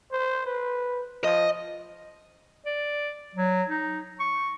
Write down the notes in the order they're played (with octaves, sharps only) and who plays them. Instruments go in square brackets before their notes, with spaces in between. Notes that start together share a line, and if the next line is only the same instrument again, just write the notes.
[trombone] C5
B4
[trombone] F3 [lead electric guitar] D#5
[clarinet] D5
F#3
D#4
C#6